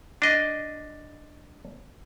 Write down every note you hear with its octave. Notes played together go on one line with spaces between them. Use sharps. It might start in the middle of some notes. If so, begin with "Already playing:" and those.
D4 D#5